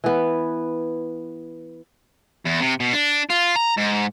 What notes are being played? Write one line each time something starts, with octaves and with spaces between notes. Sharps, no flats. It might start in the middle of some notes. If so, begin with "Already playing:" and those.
E3 B3
E2
C3
B2
D4
F4
A#5
G#2